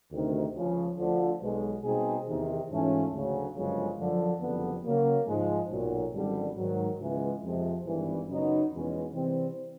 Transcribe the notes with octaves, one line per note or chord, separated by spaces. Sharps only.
D2 C3 D#3
C#2 C#3 F3
D2 D3 F3
B1 B2 G#3
B2 G3 C4 D#4 G#4
E2 C3 D#3
G#2 E3 A3 C#4 F4
D2 C#3 F#3
G1 F#2 C#3 F3 G#3
F#2 D3 F3
F#1 F2 D3 G3 B3
C#3 F#3 A#3
G#2 F3 G#3
B1 A#2 F#3
G#1 F#2 D3 G3
G#2 D#3 F#3
C#2 C#3 E3 G#3 B3
F2 C3 F3 G#3
G#1 G2 E3
F#2 C#3 F#3 B3 D#4
E2 B2 G#3 C#4
C3 E3 G3 C4